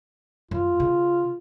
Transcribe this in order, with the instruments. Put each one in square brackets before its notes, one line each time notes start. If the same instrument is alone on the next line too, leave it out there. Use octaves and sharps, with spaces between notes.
[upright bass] F#2 [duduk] F4
[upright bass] C#3